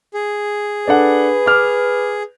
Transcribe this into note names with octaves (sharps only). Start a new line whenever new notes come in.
G#4
D4 A4 B4 F#5
D6 F6